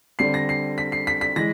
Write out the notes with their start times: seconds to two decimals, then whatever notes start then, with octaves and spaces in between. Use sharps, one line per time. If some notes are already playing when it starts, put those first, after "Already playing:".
0.19 D3 G3 C4 C7
0.34 A#6
0.49 C7
0.78 B6
0.92 C7
1.07 B6
1.21 B6
1.36 E3 G#3 A#6